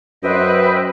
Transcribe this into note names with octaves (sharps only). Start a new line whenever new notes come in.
F#2 B4 C5 D#5 E5 G5